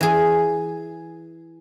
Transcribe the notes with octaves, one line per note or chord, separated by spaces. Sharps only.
E3 G#4